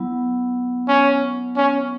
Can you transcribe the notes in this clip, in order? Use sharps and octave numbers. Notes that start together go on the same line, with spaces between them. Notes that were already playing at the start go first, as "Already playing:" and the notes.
Already playing: F#3 B3 E4
C#4
C#4